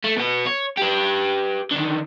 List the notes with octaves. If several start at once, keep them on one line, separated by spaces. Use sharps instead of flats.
A3
B2 B3
C#5
G4 B4
D3 D#3